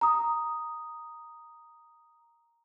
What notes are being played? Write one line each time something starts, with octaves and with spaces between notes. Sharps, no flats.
A#5 D#6